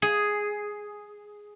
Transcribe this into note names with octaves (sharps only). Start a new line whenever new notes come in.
G#4